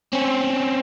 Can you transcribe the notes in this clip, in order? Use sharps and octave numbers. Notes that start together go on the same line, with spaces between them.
C4 C#4